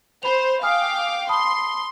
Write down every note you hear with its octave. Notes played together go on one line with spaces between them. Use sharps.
C5 B5 F7
F5 G5 G#5 D6 D#6 F6
A5 B5 C6 D#6